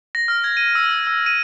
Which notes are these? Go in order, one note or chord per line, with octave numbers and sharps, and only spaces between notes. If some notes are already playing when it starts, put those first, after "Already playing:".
A#6
F6
G#6
D#7
E6
E6
D#7